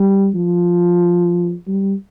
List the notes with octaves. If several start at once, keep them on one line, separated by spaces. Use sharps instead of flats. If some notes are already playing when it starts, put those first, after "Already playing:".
Already playing: G3
F3
G3